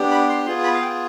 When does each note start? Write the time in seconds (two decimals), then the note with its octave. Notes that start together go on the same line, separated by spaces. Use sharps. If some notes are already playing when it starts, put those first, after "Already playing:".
Already playing: B3 D4 G4
0.11 B5
0.29 C6
0.46 B3 F4 G#4 C6
0.64 B5
0.74 F5
0.81 G5